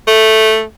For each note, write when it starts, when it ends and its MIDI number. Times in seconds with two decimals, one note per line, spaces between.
0.07 0.63 57